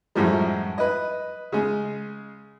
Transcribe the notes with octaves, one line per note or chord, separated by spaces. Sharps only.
F#2 A2 F3 G3 G#3
B4 D#5
C#3 G#3